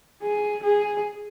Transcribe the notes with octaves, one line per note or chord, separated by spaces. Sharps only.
G#4
G#4